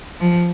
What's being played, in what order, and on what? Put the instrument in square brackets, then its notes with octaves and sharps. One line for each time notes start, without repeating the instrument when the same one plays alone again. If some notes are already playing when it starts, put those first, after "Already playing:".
[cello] F3